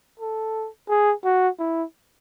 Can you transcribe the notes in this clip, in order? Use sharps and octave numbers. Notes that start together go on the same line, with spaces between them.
A4
G#4
F#4
E4